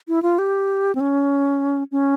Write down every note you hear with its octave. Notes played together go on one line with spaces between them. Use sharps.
E4
F4
G4
C4
C#4
C#4